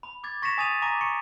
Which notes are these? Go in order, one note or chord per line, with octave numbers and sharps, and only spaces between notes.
B5
D6 G#6 A6
C#6 A#6 B6 C#7 E7 F7
G#5 D#6 A6 D#7 F7
G#5 A#5 D6 A#6 D#7
C#6 C#7 D7